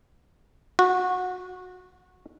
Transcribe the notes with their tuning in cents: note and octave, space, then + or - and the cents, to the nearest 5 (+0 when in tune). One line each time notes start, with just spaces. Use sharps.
F#4 -20